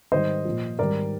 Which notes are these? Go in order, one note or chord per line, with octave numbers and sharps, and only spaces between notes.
G#2 D#3 G3 C5 D#5
A#2 F3
G#2 D#3 G3 A#4 D5